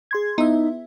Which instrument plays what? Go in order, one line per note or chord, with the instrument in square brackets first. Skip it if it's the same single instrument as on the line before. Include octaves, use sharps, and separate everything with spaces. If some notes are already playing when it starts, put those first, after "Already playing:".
[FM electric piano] G#4 C6 G#6
[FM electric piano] B3 E4 E5 [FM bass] D#4